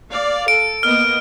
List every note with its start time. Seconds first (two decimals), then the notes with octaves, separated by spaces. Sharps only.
0.10 D5 F5
0.48 A4 D7
0.83 A#3 B3 D#5 F6